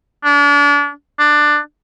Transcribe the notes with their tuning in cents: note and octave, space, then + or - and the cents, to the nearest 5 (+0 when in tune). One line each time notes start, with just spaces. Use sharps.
D4 -35
D4 +15